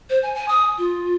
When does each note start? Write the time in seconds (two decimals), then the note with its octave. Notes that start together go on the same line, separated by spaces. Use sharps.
0.10 C5
0.23 G#5
0.35 G#5
0.48 D#6
0.78 F4